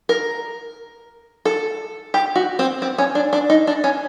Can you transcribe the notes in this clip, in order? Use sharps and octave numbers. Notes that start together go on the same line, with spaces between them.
A#4
A4
G4
F#4
C4
C4
C#4
D4
D4
D#4
D4
C#4